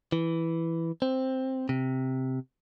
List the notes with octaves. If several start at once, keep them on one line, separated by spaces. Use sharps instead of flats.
E3
C4
C3